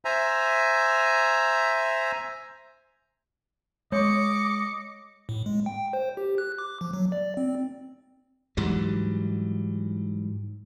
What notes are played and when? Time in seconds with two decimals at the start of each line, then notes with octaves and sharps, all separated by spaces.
0.05 C5 E5 G#5 A#5
3.92 G#3 C#5 D#5 C#6 D6 C#7
5.29 A2
5.46 G#3
5.66 G5
5.93 C5
6.17 G4
6.38 F#6
6.58 D6
6.81 F3
6.93 F#3
7.12 D5
7.37 C4
8.57 G#2 E3 F#3 G3